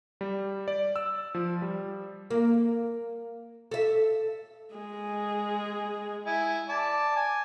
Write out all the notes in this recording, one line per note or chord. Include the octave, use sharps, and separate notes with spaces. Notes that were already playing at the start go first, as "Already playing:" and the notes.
G3
D5
E6
F3
G3
A#3
A4 E5
G#3 G#4
E4 G#5
D5 A5
G#5